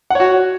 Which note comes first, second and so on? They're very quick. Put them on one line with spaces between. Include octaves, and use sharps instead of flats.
F#5 C#5 F#4